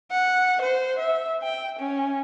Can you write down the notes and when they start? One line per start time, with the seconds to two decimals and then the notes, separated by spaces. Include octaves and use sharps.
0.11 F#5
0.62 C5
0.99 E5
1.43 G5
1.79 C#4